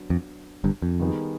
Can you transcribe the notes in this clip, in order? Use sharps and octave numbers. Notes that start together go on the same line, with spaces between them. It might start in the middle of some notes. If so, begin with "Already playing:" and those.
Already playing: F#3 B3 D4
F2
G1 G2
F2
D#3 G3 B3 D#4 G#4